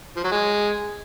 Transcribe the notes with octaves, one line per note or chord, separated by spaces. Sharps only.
F3
F#3
G#3